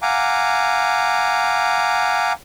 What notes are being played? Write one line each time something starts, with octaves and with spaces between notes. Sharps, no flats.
F5 F#5 G#5 A#5 D6